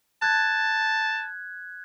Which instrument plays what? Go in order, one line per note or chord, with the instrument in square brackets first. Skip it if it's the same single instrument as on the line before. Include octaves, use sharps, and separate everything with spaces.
[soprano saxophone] A5 [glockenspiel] F#6 G#6